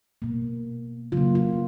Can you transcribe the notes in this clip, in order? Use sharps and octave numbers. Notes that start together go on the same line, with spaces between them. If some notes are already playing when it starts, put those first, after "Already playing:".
B2 A#3
C#3 F#3 A#3 F4
F4